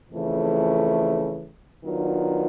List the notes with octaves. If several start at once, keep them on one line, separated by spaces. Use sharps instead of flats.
F2 C#3 E3 A3
D#3 F#3 B3 D4 F4